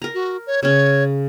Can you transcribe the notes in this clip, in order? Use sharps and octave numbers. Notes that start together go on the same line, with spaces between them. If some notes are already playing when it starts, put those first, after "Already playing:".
A#4 A#5
F#4
C#5
C#3 C#4 C#5